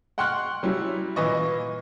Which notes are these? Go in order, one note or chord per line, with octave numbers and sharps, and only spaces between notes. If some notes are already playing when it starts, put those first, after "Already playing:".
F#5 G5 C6 C#6 F6 F#6
F#3 G3 C#4 E4
A#2 E3 B4 D#5 C#6